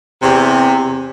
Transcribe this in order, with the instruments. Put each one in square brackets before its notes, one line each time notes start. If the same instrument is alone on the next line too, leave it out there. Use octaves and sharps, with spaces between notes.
[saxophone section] E2 C3